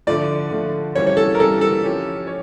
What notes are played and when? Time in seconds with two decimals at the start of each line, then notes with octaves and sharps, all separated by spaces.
0.07 D3 F3 A3 D5
0.50 D3 F3 A3
0.95 E3 G3 A#3 C#4 C#5
1.07 C#5
1.17 A4
1.35 A#4
1.39 E3 G3 A#3 C#4 A4
1.61 A4
1.84 F3 C#4 G4 C#5
2.27 C#5